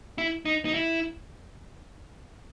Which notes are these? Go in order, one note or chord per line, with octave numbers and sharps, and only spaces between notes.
E4
D#4
D#4
E4